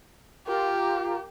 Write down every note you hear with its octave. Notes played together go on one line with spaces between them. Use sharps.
F4 G4 A#4